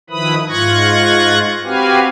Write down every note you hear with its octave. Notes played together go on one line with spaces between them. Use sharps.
D#3 F3 E4 B4 B5 D#6
G#2 F4 C#6 F#6 G#6 A#6
C4 F#4 G4 B4 F5 G#5